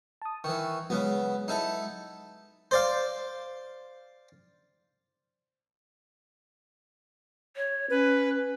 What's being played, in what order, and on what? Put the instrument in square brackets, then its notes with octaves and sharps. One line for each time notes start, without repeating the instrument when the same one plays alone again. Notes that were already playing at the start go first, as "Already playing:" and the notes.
[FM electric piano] A5 D#6
[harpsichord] D#3 E3 [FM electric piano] C#6
[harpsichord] C#3 B3 [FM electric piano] F#3 G#3
[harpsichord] D#4 E4 A4
C5 D5 F5
[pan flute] C#5
[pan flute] C#4 [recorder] B4